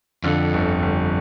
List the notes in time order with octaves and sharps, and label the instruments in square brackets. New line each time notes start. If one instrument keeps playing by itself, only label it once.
[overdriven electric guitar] F2 [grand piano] D3
[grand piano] G1
G1